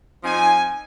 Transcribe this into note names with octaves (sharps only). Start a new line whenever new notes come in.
F3 C4 D#4 G#5